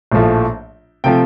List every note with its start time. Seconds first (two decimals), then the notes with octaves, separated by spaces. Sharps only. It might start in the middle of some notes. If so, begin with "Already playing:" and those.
0.12 A#1 A2 F3 A3
1.04 C3 F3 A3 G5